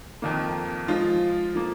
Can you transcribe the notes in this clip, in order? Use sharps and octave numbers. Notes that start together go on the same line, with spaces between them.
F2 D#3 A#3
F3 G#3 F4
F3 A#3